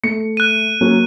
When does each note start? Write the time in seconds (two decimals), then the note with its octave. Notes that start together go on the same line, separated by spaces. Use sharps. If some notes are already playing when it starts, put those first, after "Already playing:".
0.03 A3 C#7
0.37 F#6 D#7
0.81 F#3 A#3 C#4